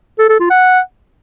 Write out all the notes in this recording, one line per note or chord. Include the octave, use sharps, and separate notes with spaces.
A4
A4
F4
F#5